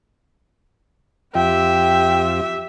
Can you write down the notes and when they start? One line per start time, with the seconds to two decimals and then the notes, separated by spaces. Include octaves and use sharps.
1.35 F2 F4 G4 E5 G5